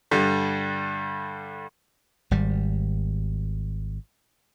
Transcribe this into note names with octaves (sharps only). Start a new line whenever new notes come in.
G2 D3 G3
G#1 G3